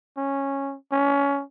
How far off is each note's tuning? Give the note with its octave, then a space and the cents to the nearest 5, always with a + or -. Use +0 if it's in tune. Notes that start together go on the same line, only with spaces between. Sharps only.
C#4 -10
C#4 +20